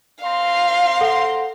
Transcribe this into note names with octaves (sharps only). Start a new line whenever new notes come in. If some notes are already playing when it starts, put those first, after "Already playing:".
C4 F5 A#5 C6
A4 F#5